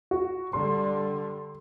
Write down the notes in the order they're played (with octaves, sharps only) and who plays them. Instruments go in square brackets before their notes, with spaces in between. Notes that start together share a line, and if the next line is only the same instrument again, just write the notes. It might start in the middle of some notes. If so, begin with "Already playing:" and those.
[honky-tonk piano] F#4
[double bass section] D3 G3 [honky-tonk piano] C6